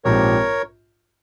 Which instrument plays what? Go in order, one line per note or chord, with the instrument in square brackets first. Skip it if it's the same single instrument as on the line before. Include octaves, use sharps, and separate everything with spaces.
[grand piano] A#1 G#2 F3 C4 G4 [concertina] A#4 C#5